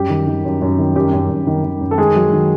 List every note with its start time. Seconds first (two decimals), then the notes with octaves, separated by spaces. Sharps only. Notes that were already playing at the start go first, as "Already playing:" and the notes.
Already playing: F#2 G3 G4
0.10 D#3
0.27 D#3
0.45 F#2
0.62 F#2
0.79 D#3
0.96 F#2 G3 G4
1.13 F#2
1.30 F#2
1.47 D#3
1.64 D#3
1.81 F#2
1.91 A4
1.98 D#3 G#3 G#4
2.16 F#3
2.33 D#3